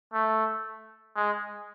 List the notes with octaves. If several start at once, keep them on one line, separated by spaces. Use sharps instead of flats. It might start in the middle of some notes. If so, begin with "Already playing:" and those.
A3
G#3